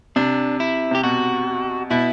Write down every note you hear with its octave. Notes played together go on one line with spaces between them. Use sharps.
C3 D4
E4
C3 G4
B2 F#4
B2 E4